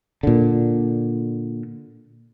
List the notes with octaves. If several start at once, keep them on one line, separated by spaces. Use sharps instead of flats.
A#2 D3